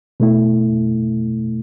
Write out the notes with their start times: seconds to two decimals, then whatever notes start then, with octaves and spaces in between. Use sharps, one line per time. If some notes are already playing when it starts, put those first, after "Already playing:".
0.20 B2 A3 E4